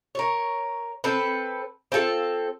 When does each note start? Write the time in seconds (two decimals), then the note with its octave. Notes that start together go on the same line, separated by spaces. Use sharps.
0.15 A#4 C#5
1.04 C4 A4 B4
1.92 C4 F4 G#4 A4